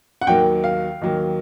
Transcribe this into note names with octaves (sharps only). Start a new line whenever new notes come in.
F#5
D#2 D#3 F#3 A#3 G5
F5
D#2 D#3 F#3 A#3